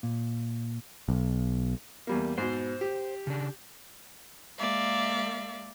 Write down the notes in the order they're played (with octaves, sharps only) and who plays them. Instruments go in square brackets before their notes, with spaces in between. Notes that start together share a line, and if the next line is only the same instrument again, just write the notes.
[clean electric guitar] A#2
[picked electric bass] B1
[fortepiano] E2 G3 A#3
[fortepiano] G#2 B2 [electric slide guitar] C5
[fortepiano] G4
[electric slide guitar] C#3 D4
[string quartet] G#3 A#3 D5 E5 F5